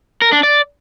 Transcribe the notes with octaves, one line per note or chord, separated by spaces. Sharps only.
A#4
D4
D5